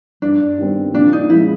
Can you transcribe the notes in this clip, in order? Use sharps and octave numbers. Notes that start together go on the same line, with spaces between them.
G2 D4
D#3 G3 C4
A#2 D4
D#4
F3 G#3 C#4 E4